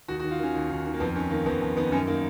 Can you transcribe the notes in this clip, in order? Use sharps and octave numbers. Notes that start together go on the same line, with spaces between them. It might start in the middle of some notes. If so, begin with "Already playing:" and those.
D#2 F#4
F#4
D#3
F4
D#3 C#4
D#2
D#2
D#3
A#3
F2 B3
D#3 C#4
D#3 A#3
F2 B3
F2
D#3 B3
F#2 C#4
D#3 A#3